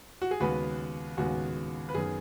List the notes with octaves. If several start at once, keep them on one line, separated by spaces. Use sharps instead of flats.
F#4
G#4
D#2 C#3 G#3 B3 F#4 B4
D#2 C#3 G#3 B3 F#4
B4
F#2 D#3 B3 G#4